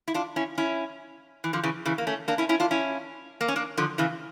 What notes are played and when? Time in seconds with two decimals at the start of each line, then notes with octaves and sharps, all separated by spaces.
0.08 E4
0.14 D4 F4
0.36 C#4 E4
0.58 C#4 E4
1.44 E3
1.53 D3 F3
1.63 C#3 E3
1.86 C#3 E3
1.98 A#3
2.07 A3 C#4
2.28 A#3 D4
2.38 C#4 E4
2.49 C#4 E4
2.60 D4 F4
2.71 C#4 E4
3.41 A#3
3.48 C#4
3.56 A#3 D4
3.77 D3 F3
3.98 C#3 E3